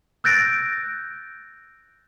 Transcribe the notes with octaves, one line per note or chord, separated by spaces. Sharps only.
E6 F#6 G6 A6 A#6 D7